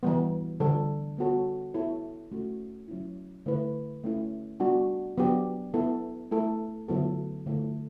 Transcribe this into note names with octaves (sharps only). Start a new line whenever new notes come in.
E3 G3 B3
D3 G3 D4 A4
G3 B3 F#4 A4 C#5
B3 E4 A4 C#5
A3 C#4 F#4
F#3 C#4 E4
D3 A3 E4 B4
A3 C#4 E4
G3 B3 D4 F#4
F#3 B3 D4 G4
B3 E4 A4
A3 E4 A4
D3 F#3 B3 E4 A4
D3 A3 E4 A4